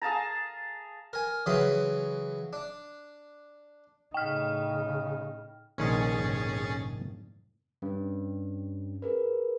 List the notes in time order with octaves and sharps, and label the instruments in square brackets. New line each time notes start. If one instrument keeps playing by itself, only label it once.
[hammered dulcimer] G#4 F5 A5 A#5
[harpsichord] A#4 G#5
C#3 E3 F#3 B5 C6 D#6
D4
[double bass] A2 D#4 [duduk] C#3 [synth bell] G5 F6
[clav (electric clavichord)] A#1 D#3 [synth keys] C3 C6 [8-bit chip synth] C#4 G#4 A6
[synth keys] F2 G#2 C3
[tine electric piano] G2 [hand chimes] C#4
[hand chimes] G#4 A#4 B4